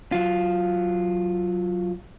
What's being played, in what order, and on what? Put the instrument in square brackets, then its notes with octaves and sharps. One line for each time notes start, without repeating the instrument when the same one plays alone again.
[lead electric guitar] F#3 F4